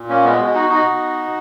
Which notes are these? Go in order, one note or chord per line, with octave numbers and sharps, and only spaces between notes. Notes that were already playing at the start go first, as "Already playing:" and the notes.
Already playing: A#2
A#3 C#4
G#3 B3
B2 G#3
D#4 F#4
D#4 F#4
B2